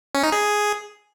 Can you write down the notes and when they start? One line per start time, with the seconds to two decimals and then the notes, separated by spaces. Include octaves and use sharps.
0.15 C#4
0.23 D#4
0.32 G#4